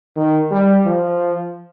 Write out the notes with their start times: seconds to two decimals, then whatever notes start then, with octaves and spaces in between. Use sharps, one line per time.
0.16 D#3
0.51 G3
0.86 F3